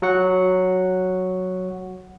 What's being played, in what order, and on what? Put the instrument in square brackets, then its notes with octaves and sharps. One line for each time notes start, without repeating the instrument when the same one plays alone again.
[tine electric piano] F#3 F#4 F#5